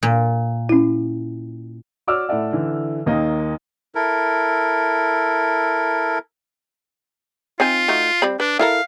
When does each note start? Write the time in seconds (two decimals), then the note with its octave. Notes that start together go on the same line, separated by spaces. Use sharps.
0.03 A#2
0.69 C#4 E4
2.07 F#4 C#5 D5 D6 E6 F6
2.29 A2 E4 A4 D5 F#5
2.53 D3 E3
3.06 D#2 D#3 A#3 D#5
3.95 E4 A4 A#4
7.60 C4 D#4 F4 G#5
7.88 A3 D#4 F#4
8.22 G3 C4 B5
8.40 D4 B4
8.59 E4 A4 A#4 F5